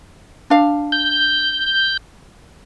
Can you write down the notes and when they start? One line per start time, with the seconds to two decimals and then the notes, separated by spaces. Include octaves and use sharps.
0.50 D4 F5
0.92 G6